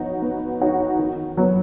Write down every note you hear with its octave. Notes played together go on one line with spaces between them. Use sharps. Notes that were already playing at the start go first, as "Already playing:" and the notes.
Already playing: B3 D#4 F#4 C#5
B3
D#4 F#4 C#5
D#3
F#3 B3